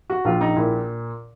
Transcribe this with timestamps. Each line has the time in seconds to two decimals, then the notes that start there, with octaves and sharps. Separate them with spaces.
0.10 F#4
0.25 A#1 F4
0.41 D#4
0.56 A#2 E4